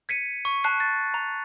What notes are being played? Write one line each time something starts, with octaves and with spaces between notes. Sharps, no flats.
G#6 B6 C#7 D#7
C#6
A5 F#6 C7
A6
A#5